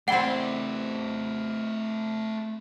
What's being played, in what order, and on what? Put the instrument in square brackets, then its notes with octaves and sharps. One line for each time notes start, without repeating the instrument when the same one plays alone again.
[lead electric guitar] A3 C5 [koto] C4 E4 D5 [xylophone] F#5 G5 G7